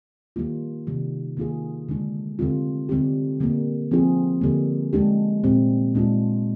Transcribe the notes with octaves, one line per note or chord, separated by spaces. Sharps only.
D#3 G3 A#3 F4
C3 D#3 G3
D#3 A#3 D4 F4 G#4
D3 G#3 D4
D3 G3 C4 F4
D3 G3 C4 G4
D3 G3 A#3
F3 C4 F4 G#4
D3 G3 A#3
G#3 D4 G4
A#2 G3 C4
A#2 G#3 D4 F4